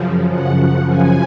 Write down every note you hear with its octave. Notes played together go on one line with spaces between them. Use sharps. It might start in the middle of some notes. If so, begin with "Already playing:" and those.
Already playing: F#2 C#3 F3
F#5
F#5
G#5